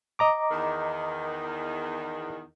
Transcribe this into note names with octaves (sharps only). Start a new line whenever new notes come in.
D#5 A#5 D6
E2 D#3